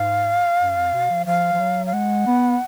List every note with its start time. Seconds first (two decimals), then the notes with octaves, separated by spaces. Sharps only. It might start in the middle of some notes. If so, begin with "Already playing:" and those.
Already playing: G#2 F5
0.59 F#2
0.76 F2
0.93 B2
1.10 F3
1.26 F3 F5
1.53 F3
1.60 F#3
1.86 F5
1.93 G#3 F#5
2.26 B3